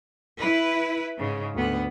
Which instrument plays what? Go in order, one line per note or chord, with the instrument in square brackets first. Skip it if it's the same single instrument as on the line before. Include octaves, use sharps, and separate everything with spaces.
[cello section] E4 B4
G#2 C#3
D2 B3